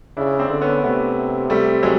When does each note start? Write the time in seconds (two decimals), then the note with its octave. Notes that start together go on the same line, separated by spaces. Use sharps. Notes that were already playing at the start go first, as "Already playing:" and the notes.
0.17 C#3 D4 E4
0.39 C4 D4
0.50 D3
0.62 B3 C#4
0.84 C3 A3 B3
1.50 G3 A3
1.83 F#3 G#3